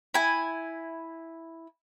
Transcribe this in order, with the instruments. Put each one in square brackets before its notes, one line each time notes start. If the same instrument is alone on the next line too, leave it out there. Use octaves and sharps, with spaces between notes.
[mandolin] E4 G#5